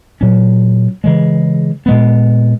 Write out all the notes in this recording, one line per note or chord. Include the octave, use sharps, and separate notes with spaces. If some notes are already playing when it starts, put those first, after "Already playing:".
A#2 F#3 C#4
C#3 E3 G#3
A#2 G#3 B3